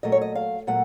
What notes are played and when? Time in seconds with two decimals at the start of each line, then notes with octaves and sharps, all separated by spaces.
0.03 A#2 F#3 A3 D#5
0.12 C#5
0.21 D#5
0.35 F5
0.67 A#2 F#3 A3 F#5